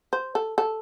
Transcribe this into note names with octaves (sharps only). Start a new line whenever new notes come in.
C5
A4
A4